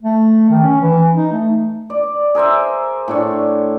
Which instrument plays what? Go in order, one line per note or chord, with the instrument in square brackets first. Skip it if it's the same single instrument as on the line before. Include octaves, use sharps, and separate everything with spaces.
[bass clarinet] A3
D#3
C#4
E3
D#4
A3
[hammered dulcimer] D5
G#4 A#4 C5 E5
A2 D4 C#5